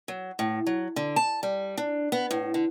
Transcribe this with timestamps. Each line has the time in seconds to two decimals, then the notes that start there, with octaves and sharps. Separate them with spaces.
0.08 F#3
0.39 A2
0.67 F#3
0.96 D3
1.16 A5
1.43 G3
1.78 D4
2.12 B3
2.31 A2
2.54 D3